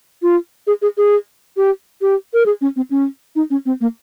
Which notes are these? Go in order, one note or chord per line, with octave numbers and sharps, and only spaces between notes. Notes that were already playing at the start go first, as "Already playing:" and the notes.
F4
G#4
G#4
G#4
G4
G4
A#4
G#4
C#4
C4
C#4
D#4
C#4
C4
A#3